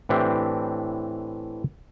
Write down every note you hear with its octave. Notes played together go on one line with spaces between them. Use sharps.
A2 E3 C4 D4 G4